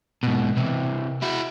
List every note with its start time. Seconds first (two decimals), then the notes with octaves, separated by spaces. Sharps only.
0.23 G#2 B2
0.57 C3 E3
1.22 E4 F#4